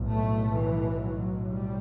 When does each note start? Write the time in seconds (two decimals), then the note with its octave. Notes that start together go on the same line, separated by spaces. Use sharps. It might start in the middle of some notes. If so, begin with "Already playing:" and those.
Already playing: B1 A2
0.10 A3
0.56 E3
1.04 F#3
1.50 G3